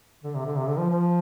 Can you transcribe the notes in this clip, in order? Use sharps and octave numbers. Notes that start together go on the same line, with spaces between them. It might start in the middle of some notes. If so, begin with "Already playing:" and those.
D3
C3
D3
C3
D3
F3
F3